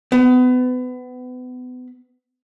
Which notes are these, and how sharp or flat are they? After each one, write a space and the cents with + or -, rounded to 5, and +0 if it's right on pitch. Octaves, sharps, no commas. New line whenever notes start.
B3 +30